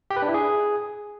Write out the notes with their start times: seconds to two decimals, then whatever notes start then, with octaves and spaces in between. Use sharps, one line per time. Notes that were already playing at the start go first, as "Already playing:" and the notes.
0.11 G4
0.16 B4
0.22 D4
0.28 E4
0.34 G#4